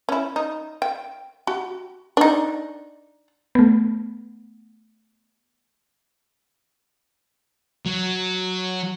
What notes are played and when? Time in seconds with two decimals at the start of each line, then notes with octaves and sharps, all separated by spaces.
0.09 C#4 E4
0.36 D#4
0.82 G5
1.47 F#4 G4
2.17 D4 D#4
3.55 A3 B3
7.86 F#3